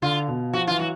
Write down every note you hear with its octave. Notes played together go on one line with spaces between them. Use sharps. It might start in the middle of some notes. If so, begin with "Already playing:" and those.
D3 F4
B2
F3 F#4
E3 F4
F#3 F#4